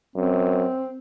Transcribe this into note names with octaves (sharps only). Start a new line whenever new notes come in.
F#2 C4